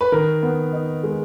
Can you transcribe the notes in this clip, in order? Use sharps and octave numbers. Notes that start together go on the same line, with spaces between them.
B4
D#3 A#4
B3
D#4
G#3